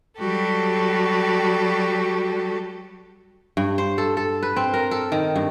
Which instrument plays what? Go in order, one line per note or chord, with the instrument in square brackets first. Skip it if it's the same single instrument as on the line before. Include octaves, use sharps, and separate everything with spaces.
[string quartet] F#3 G3 F#4 G4 A4
[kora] G2
C5
A4
A4
B4
C4
A#4
A4
D#3
G2